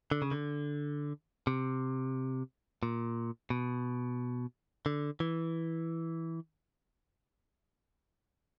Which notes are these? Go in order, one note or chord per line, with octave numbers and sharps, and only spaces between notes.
D3
C#3
D3
C3
A#2
B2
D3
E3